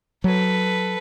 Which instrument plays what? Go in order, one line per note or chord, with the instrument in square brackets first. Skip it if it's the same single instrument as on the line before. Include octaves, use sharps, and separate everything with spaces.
[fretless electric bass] F#3 [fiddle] A4 B4